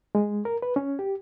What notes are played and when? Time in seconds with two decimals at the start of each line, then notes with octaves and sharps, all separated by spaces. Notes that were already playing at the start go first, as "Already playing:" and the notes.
0.15 G#3
0.45 A#4
0.62 B4
0.76 C#4
0.99 G4